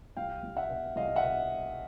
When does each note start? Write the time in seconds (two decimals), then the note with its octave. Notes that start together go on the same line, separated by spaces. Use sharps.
0.17 C2 F5 G5
0.43 C2
0.57 E5 F#5
0.69 B2
0.96 C2 D#5 F5
1.16 E5 F#5
1.23 B2